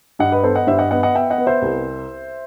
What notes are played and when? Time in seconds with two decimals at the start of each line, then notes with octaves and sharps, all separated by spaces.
0.19 G2 D#5 F#5
0.32 B4 D#5
0.43 B3 A4 C5
0.55 D#5 F#5
0.67 G2 C5 E5
0.79 D#5 F#5
0.91 B3 D#5 F#5
1.03 D#5 F#5
1.15 B3 E5 G5
1.30 D#5 F#5
1.38 B3
1.47 C5 E5
1.62 C2